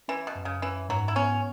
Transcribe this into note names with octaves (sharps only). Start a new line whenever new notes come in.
E3 C#4
B2
F#2
C#3
E3 C#4
G#2 F#3
E4
B3 C#4